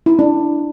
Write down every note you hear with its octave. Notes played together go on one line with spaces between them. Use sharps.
E4
D4